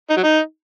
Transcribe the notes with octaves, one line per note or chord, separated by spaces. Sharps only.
D#4
F#3
D#4